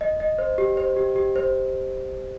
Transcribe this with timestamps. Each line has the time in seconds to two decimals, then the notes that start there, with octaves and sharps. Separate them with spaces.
0.01 D#5
0.20 D#5
0.38 C5
0.58 G4
0.77 C5
0.97 G4
1.16 G4
1.36 C5